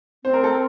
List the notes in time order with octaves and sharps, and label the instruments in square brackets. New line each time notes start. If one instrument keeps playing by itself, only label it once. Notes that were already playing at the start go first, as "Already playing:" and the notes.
[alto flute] C4 [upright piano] C5
[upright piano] A#4
A4
A#4